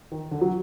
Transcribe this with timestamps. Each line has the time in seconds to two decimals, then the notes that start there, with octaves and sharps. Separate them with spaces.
0.12 D#3
0.31 D3
0.41 F#3